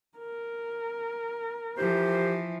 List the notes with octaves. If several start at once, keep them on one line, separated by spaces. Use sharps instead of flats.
A#4
E3 F3 G4 C5